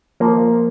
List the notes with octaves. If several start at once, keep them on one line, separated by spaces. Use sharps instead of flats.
F3 A#3